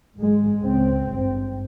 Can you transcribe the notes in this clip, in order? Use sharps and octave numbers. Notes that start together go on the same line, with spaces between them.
G#1 G#2 G#3
C#2 C#3 C4
G#1 G2